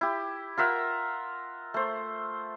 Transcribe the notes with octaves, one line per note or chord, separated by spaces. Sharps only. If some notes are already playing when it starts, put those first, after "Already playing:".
E4 G4
F4 A#4 E5 F#5
A3 C5